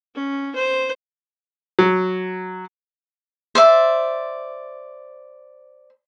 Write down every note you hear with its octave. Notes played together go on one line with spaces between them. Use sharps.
C#4
C5
F#3
C5 D5 E5